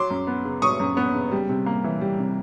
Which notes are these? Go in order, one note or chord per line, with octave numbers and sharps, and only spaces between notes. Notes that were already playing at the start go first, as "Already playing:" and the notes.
Already playing: F#3 C6 D6
F#2
B3
C#3
F#3 C#6 D#6
F#2
B3
C#3
G3
C3
A#3
E3
G3
C3